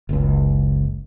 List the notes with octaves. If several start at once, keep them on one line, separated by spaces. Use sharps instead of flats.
F#1 C#2